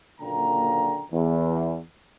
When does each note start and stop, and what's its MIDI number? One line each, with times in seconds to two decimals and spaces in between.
0.20 1.04 30
0.20 1.04 46
0.20 1.04 50
0.20 1.04 58
0.20 1.04 79
0.20 1.04 82
1.11 1.77 40